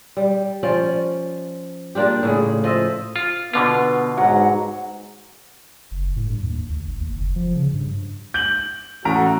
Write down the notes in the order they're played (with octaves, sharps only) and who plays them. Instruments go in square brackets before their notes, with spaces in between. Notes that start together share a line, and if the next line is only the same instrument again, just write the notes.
[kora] G3
F3 C#4 D5
A#3 D4 F4 G4
A2 C#3 G#4
F3 D#5 E5
[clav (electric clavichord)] F4
[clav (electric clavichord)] B2 D3 F4 [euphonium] B3
[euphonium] G#2 [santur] F#3 F#5 A#5
[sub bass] F#1
A2
G2
D#2
D2
G#1
D#2
F#1
F3
C#3
G2
[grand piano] G6 F#7
[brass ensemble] A2 F#4 A4 [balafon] E3 A3 C#4 [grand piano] A#5